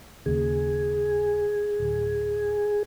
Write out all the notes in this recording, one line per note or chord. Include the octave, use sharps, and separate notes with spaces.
D#2 C#3 G#4
D1